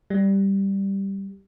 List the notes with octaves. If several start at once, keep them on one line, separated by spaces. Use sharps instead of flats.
G3